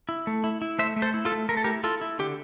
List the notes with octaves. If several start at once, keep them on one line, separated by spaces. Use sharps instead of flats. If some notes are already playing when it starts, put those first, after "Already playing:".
E4
A3
E4
E4
A3 C5 E5
A3
A4 C5
E4
F4 A4
A3
A3 A#4
A4
E4 G4 A#4
E4 F4 A4
E4
D3 G4